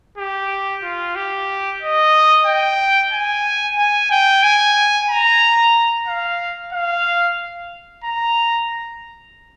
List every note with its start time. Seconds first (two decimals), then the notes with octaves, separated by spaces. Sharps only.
0.17 G4
0.83 F4
1.15 G4
1.82 D#5
2.46 G5
3.12 G#5
3.78 G#5
4.11 G5
4.43 G#5
5.09 A#5
6.07 F5
6.72 F5
8.04 A#5